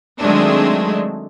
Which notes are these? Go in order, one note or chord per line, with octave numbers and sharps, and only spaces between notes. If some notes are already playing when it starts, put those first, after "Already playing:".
D#3 F#3 G#3 A3 C4 D4